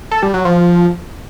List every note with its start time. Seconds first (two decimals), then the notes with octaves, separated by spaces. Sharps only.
0.11 A4
0.23 G3
0.34 F#3
0.45 F3